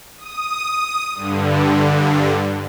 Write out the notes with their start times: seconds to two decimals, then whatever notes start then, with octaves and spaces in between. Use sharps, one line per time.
0.17 D#6
1.15 G2 D3